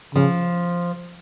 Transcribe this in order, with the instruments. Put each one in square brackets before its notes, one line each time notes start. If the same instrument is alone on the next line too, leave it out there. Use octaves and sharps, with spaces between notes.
[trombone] C#3 [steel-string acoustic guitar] F3